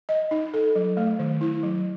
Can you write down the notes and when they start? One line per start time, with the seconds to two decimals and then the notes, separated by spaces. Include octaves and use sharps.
0.09 D#5
0.31 D#4
0.54 A4
0.76 F#3
0.97 A3
1.19 D#3
1.41 E4
1.63 F#3